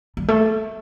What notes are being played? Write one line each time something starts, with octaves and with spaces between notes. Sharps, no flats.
G3
A3